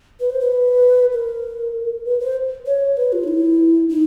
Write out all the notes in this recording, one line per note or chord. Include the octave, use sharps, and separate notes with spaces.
B4
C5
B4
A#4
B4
C5
C#5
B4
F4
D#4
E4
D#4